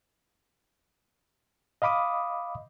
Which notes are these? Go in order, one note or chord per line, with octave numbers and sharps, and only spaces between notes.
D#5 F5 B5 D6 D#6